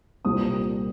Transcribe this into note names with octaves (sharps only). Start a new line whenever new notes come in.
C2 A#2 G3 C4 D#6